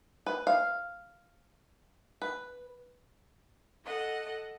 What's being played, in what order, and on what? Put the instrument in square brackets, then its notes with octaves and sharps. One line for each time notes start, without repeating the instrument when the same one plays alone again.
[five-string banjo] B4
F5
B4
[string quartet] A4 D#5 F#5